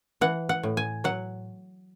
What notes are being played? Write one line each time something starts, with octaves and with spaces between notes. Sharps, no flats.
E3 F#5
F#5
A2
G#5
F#3 F#5